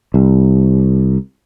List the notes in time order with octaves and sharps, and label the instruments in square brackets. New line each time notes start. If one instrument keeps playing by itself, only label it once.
[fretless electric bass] C2